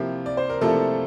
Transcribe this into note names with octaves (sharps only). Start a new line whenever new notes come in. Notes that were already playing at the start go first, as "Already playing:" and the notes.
Already playing: C3 F3 A#3 E4 G4
D5
C5
A#4
C3 F3 A3 A#3 E4 A4